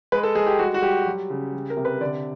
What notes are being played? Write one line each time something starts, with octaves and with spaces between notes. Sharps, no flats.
G#3 B4
A4
G#3 G#4
G4
G3 F#4
F#4
G3 G4
F#3
C#3
G3
A#4
C3
B4
D3 D5